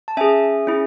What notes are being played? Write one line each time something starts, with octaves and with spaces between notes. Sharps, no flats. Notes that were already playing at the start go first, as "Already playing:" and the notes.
A5
C#4 G#4 E5 G#5
C#4 E4 G#4